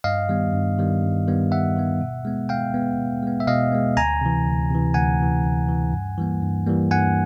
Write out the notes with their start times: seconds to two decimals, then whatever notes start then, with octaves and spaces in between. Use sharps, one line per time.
0.04 G2 D#5 F5
0.29 D#3 G3 B3
0.53 G2
0.78 D#3 G3 B3
1.03 G2
1.27 D#3 G3 B3
1.52 G2 E5 F#5
1.76 D#3 G3 B3
2.01 B2
2.25 G#3 B3
2.49 B2 F5 G5
2.74 G#3 B3
2.99 B2
3.23 G#3 B3
3.40 E5
3.47 B2 D#5 F5
3.72 G#3 B3
3.97 D2 G#5 A#5
4.21 C3 E3
4.45 D2
4.71 C3 E3
4.94 D2 F#5 G#5
5.20 C3 E3
5.44 D2
5.68 C3 E3
5.92 G2
6.18 E3 G3 A#3
6.42 G2
6.66 E3 G3 A#3
6.91 G2 F#5 G#5